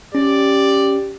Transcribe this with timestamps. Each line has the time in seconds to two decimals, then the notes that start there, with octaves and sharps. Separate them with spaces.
0.15 C#4 G4 D5